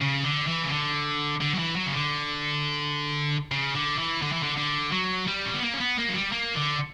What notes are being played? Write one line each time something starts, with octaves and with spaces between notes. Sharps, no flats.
C#3
D3
E3
C#3
D3
D3
F#3
E3
F#3
C#3
D3
C#3
D3
E3
D3
E3
D3
D3
F#3
G3
C#4
B3
A#3
C#4
B3
A#3
F#3
G3
A#3
D3